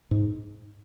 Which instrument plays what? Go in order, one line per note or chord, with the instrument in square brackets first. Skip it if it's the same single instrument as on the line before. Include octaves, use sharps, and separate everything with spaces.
[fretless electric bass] G#2